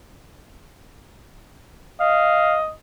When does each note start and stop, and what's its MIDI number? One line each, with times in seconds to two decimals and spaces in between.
2.00 2.71 75
2.00 2.60 77